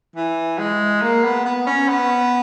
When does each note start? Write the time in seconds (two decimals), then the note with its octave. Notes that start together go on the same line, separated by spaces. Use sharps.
0.16 E3
0.59 G#3
1.01 A#3
1.24 B3
1.45 B3
1.66 C#4
1.88 B3